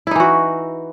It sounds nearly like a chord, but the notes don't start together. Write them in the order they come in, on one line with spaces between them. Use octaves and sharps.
E4 D#4 E3 F#4